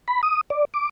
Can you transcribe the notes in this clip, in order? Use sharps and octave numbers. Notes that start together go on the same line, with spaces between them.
B5
D#6
D5
D6